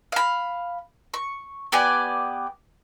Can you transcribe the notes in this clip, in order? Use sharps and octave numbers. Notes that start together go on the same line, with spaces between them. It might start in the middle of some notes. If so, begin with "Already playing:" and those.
F5 B5
C#6
B3 G4 D5 G#5